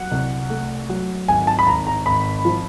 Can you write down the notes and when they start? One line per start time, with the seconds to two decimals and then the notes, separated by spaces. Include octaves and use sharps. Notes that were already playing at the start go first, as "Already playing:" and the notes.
Already playing: F#3 F#5
0.12 C2
0.50 A3
0.89 F#3
1.28 G#1 G#5
1.47 A5
1.59 B5
1.67 G#1 A#5
1.87 A#5
2.06 G#1 B5
2.45 F3